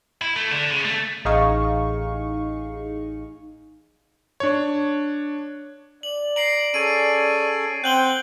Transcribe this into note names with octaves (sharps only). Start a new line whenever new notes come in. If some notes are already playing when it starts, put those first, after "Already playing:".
E4
A3
D3
C#3
A3
A1 D#4 G#4 F5 C#6
D4 C#5
D5 F#7
A#5 C7 D7 F#7
C#4 G#4 A4 D#7
C4 F#5 G5 G6 F#7 G7